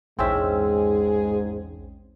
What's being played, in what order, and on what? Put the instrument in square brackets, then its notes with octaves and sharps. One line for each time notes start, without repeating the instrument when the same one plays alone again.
[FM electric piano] A#1 E2 [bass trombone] G#2 [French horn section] G#3 G#4 [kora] C4 C#4 E5